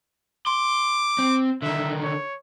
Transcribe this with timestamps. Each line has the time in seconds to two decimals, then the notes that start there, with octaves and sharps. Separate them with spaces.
0.47 C6 D6
1.19 C4
1.62 D3 D#3 E5
2.03 C#5